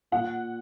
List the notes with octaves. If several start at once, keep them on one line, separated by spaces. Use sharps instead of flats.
A#2 F#5